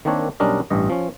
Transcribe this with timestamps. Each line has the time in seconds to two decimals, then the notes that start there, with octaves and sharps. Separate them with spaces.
0.05 D#3 A#3 C4 D4 C#5
0.40 B1 G3 C#4 D4 A#4 D#5
0.70 A1 G2 D#5
0.90 F3 C#4